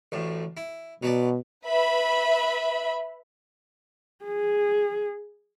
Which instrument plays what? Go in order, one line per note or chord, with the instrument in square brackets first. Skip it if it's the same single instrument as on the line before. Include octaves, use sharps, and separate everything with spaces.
[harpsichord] A1 D2 A2
E4
[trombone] B2 [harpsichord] F#3 B4 D5
[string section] B4 E5 B5
[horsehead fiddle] G#4